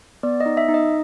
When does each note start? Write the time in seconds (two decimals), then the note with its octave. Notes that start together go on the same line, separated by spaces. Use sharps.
0.23 B3 D5
0.40 D#5
0.46 D#4
0.57 E5
0.69 D#4
0.74 D#5